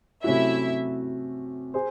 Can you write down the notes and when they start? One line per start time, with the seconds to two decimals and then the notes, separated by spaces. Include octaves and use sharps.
0.24 C3 F#3 A3 C#4 E4 F#4 E5
1.74 G#4 C5